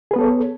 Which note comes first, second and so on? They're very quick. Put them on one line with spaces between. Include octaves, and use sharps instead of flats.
G#4 B4 B3 A4 C#5